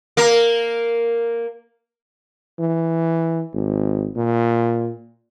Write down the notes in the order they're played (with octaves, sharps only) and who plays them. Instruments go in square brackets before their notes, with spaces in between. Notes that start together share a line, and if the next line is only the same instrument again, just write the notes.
[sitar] A#3 A#4
[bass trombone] E3
G#1
A#2